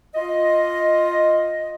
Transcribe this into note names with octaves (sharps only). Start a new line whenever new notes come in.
F4 D#5